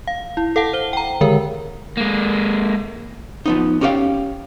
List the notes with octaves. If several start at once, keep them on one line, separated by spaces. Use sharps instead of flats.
F5
E4
A4 F5 F#5 A5
C5 G7
G5 A#5
D3 D#3 G#3 A#4
G#3 A#3
F3 B3 D#4
C#4 G4 G#4 C#5 F5 G5